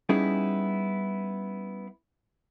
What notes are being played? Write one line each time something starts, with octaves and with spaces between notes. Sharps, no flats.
G3 B3 C#4 D#4 E4 G#4